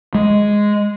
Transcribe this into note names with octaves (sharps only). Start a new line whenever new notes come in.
G#3